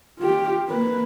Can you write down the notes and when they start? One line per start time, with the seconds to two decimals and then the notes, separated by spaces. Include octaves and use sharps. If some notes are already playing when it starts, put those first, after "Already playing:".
0.19 F4 G4
0.68 A#3 B4